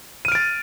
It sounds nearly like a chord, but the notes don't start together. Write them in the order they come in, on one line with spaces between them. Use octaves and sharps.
D#7 F6 D7 A6